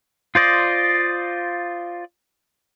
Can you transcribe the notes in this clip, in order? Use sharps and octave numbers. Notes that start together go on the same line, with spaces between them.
F4 C5 D5 D#5